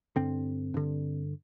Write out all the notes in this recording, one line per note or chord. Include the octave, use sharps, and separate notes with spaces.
G2 D3 C4
G2 D3